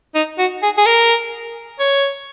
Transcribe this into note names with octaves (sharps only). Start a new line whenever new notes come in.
D#4
F#4
G#4
G#4
A#4
C#5